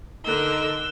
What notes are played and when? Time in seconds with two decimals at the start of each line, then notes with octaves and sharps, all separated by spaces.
0.25 D3 D#4 A#4 E6 F#6 G7